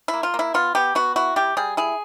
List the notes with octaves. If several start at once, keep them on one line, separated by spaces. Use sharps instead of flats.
E4
A#3
F4
A#3
E4
B3 F4
B3 G4
B3 F#4
E4 F#4
G3 G4
G3 G#4
E4 G#4